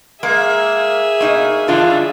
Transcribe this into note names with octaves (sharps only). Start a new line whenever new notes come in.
G#3 A#3 G#4 E5
B2 A#3 D#4 D#5
G2 D3 E3 D4 F4